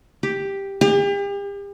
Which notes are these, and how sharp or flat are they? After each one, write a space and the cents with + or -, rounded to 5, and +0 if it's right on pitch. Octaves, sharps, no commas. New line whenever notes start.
G4 +5
G4 +40